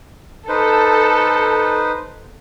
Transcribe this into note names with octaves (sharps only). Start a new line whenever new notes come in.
D#4 A4 B4 C5